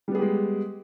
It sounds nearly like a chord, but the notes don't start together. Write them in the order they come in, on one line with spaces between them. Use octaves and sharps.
G3 B3 G#4 G4 G#3